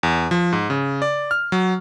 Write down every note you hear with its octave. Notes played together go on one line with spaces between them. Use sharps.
E2
F3
G#2
C#3
D5
F6
F#3